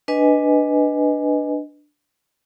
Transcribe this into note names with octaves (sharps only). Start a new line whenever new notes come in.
D4 B4 D#5 G#5